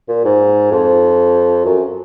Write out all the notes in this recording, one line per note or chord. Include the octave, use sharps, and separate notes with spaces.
A#2
G#2
F2
F#2